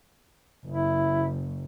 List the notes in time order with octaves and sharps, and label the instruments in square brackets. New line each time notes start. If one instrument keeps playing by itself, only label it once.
[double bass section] F#1 [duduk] E4